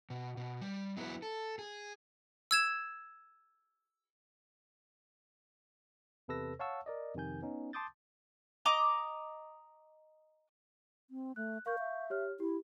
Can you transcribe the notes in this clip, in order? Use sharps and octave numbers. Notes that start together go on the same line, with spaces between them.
B2
B2
G3
F#3 B3 E4 A4 B4
A4
G#4
E6 G#6 E7
E2 C3 A4 B4 E6 A#6
C#5 F5 F#5 A5 C#6 E6
A#4 D5 D#5
F2 C3 D#3 G#5 G6
B3 C#4 D#4
A5 C6 D6 D#6 G6 A6
D#5 A#5 D6 D#6
C4
A3 F#6
A#4 F5 C#6 G6
E5
G4 C#5 F6
E4 G4